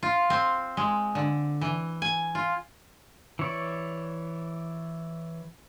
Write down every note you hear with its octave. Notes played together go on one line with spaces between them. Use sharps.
F4
C4
G#3
D3
E3
G#5
F4
E3 C#5 D5